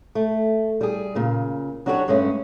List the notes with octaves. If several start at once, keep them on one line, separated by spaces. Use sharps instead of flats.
A3
G3 G#4
A#2 C#3
F#3 D4 F#4 G4 A4 C#5
G2 G#3 A3 C#4